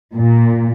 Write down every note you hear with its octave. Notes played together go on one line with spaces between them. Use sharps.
A#2